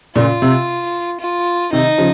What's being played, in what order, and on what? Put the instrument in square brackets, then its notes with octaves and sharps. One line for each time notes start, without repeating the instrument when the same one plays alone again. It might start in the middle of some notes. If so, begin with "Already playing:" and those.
[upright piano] A#2 C#3 [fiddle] F4
[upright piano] C3
[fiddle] F4
[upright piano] C3 D#3 [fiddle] D#4
[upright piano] C#3 F3